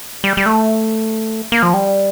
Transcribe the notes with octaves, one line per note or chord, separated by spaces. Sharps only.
G3
G3
A3
A#3
F3
G3